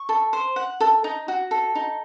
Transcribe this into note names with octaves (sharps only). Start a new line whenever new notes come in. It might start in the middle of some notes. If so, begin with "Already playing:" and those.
Already playing: C#6
A4
C5
F#5
A4
D#4
F#4
A4
D#4